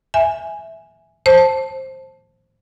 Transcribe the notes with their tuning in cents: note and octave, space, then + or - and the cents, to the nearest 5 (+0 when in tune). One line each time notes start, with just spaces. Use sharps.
E5 +0 G#5 +0
C5 +15 A5 +0